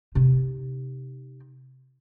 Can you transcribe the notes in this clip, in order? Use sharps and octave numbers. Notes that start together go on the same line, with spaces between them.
C3 D#4